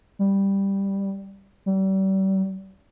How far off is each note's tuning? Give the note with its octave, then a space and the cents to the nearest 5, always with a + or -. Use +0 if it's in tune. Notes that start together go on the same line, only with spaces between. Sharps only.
G3 +5
G3 -35